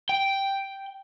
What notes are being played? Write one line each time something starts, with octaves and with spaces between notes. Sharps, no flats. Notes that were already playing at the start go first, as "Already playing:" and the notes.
G5